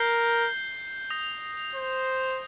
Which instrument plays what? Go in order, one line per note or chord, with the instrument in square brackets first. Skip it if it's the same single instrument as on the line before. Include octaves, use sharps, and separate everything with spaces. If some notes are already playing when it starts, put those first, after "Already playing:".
Already playing: [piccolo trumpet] A#4 [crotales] G6 C7 G7
[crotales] D#6 A#6 F7
[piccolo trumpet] C5